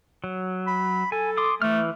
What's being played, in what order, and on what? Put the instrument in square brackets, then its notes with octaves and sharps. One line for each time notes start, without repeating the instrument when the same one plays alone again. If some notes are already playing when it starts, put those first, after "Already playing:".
[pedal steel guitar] F#3
[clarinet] B5
[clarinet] A4 [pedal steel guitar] G#5
[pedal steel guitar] C6 D6 D#6
[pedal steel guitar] E3 F6 [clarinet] A3